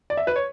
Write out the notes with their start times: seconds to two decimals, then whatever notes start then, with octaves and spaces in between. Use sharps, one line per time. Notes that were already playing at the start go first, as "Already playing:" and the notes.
0.10 D5
0.17 E5
0.27 B4
0.36 C#5